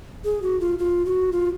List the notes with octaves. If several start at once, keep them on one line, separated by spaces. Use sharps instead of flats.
G#4
F#4
F4
F4
F#4
F4